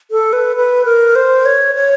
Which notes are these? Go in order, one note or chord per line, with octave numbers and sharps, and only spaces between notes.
A4
B4
B4
A#4
C5
C#5
C#5